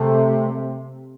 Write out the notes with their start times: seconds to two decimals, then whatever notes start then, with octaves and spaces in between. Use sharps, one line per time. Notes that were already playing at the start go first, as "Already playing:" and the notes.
Already playing: C3 A3